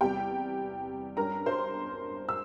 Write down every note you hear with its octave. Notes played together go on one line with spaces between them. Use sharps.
E2 C3 G3 G4 G5
G2 G3 C#4 A#4 A#5
C5 C6
E6